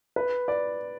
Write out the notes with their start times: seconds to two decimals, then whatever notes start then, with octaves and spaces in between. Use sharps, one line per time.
0.16 B4
0.48 D5